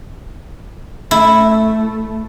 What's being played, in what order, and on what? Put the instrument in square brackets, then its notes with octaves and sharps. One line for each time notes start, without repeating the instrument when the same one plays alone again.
[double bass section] A3 [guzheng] E4